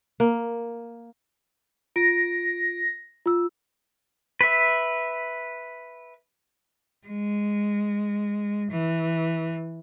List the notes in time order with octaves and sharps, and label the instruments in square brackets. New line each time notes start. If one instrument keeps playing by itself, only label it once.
[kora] A#3
[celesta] F4 D7 [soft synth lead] A#6
[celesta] F4 E6
[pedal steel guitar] B4 E5
[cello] G#3
E3